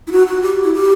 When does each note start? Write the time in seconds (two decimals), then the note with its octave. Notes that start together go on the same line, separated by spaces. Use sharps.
0.07 E4
0.12 F#4
0.27 F#4
0.42 G4
0.64 E4
0.74 G4